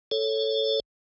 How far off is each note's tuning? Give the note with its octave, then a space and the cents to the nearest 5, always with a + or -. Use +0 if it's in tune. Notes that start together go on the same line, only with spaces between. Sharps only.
A4 +0 C#5 +0